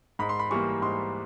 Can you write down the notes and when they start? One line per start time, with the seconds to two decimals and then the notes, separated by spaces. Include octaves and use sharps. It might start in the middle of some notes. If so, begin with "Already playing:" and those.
0.19 G#2 B5
0.29 C6
0.39 B5
0.51 E3 G3 A#3 C#6
0.82 G#2 C6